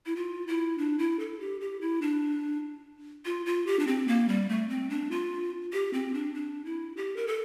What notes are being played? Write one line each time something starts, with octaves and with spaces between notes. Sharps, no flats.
E4
F4
E4
D4
E4
A4
G4
G4
E4
D4
F4
F4
G4
D4
C4
A#3
G3
A3
C4
D4
F4
G4
C4
D4
D4
E4
G4
A#4
A4